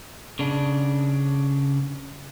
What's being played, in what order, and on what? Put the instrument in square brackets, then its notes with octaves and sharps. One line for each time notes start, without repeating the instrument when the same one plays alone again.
[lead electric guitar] C#3 D4